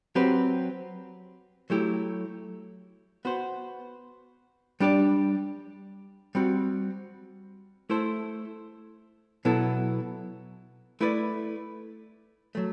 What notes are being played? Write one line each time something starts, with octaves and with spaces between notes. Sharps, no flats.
F#3 C4 G4 B4
F#3 A3 E4 G4
B3 F#4 C5
G3 D4 G4 D5
G3 C4 F#4
A3 E4 A4 C5
B2 F#3 B3 E4 A4
A3 E4 B4 D5
F#3 A3